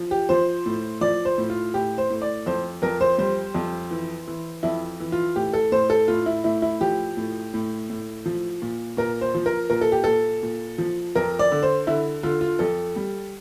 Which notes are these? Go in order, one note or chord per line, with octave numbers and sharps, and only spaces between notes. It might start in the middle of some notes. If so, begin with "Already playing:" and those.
Already playing: F3
G4
F3 C5
A2
F3 D5
C5
A2
F4
A2 G4
C5
A2
D5
F2 C5
F2 A#4
C5
G3 C5
F2
E3
E3
F2 E4
E3
F4
A2 G4
A4
A2 C5
A4
A2 F4
E4
A2 E4
E4
F3 G4
A2
A2
A2
F3
A#2
A#2 A#4
C5
F3
A#4
A#2 A#4
A4
G4
A#2 A4
A#2
F3
F2 A#4
D5
D3
C5
D3 E4
D3 F4
F4
F2 A4
G3